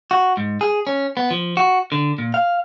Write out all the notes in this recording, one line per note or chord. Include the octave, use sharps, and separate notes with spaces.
F#4
G#2
G#4
C#4
B3
F3
F#4
D3
A#2
F5